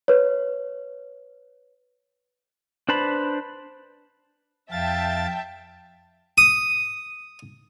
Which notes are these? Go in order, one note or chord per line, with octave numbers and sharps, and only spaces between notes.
B4 C#5
D4 B4 C5 A5 B5
F2 E5 F5 G5 A5 A6
D#6